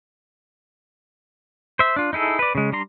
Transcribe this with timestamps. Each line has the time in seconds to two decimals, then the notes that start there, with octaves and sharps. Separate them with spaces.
1.79 C5 E5
1.96 D4 F4
2.13 D#4 E4 G#4 A4
2.39 B4 D5
2.55 C#3 G#3
2.72 G3 D4 A#5 C6